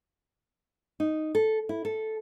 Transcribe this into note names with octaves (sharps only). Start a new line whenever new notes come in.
D#4
A4
E4
A4